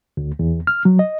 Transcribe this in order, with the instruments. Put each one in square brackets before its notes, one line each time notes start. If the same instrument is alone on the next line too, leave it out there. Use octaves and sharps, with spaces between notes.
[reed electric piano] D2
E2
F6
F#3
D#5